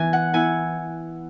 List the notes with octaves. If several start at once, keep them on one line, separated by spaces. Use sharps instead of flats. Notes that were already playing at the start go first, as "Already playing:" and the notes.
Already playing: E3 B3 E4 G#5
F#5
B3 E4 G#5